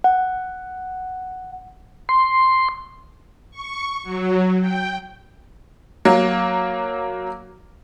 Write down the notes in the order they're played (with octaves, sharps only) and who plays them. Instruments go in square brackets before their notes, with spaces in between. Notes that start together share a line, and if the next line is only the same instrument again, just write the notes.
[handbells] F#5
[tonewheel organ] C6
[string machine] C#6
F#3
G5
[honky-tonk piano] F#3 A#3